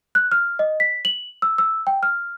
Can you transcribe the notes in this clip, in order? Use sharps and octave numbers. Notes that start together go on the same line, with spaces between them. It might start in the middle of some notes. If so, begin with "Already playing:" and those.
F#6
F6
D#5
B6
F#7
E6
E6
G5
F6